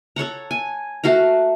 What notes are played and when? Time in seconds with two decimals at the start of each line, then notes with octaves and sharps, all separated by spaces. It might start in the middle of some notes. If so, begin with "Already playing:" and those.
0.16 A4 C#5 F#5 A#5
0.51 G#5
1.04 A3 F#4 F5 A#5